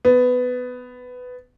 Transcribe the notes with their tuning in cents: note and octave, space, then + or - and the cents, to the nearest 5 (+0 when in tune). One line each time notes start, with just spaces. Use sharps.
B3 +15